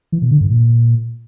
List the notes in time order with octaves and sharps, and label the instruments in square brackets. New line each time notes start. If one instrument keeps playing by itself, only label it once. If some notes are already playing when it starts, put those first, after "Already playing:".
[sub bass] E3
B2
D3
G2
A#2